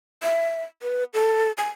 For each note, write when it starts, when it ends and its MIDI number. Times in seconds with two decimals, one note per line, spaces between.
0.23 0.63 76
0.82 1.04 71
1.14 1.52 69
1.58 1.68 80